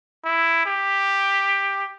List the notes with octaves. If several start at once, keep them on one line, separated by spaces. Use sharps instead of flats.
E4
G4